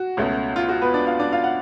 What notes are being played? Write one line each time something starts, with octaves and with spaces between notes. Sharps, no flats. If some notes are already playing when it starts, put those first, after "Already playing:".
Already playing: F#4
C#2 B2 A3 C#4
F4
F#4
B3 B4
D4 D5
F4 F5
D4 D5
F4 F5
F#5